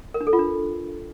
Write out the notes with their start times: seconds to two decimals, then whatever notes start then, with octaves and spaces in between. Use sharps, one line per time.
0.14 A#4
0.21 D4
0.27 A4
0.33 F4
0.39 D4